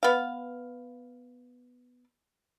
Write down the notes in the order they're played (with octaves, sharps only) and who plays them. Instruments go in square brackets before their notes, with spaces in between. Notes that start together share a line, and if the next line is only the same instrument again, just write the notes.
[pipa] B3 F5